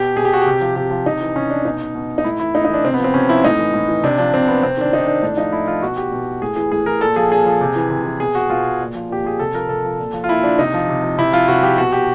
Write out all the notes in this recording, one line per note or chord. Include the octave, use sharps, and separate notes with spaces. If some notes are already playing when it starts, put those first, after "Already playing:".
Already playing: B2 G4
B2 G#4
G4
F#4
C3 G4
F3
C3 G4
F3
C3 D#4
E3
C3 C#4
E3 D4
B2 D#4
B2
D#4
A2 E4
E3 E4
A2 D#4
D#4
E3 D4
C3 C4
B3
F3 C4
C3 C#4
F3 E4
A2 D#4
E3
A2
E3
C3 D4
F3 D4
C3 C4
F3 B3
C3 C4
D#3 D4
C3 D#4
D#3 D4
A2 D4
F3 D#4
A2 E4
F3 F4
B2 F#4
G4
B2
A2 G#4
E3 G#4
A2 G#4
E3 A#4
A#2 A4
F3 G#4
A#2 G#4
F3
C3
E3
C3
E3
B2 G#4
F#4
B2 F4
A#2
F3
A#2 G4
F3 G#4
C3 A4
F3 A#4
C3 A4
F3
A#2
F3
F4
A#2 E4
F3 D4
C3 D#4
F3
C3
F3
C3 E4
F3 F4
C3 F#4
F3 G4
B2 F#4
G4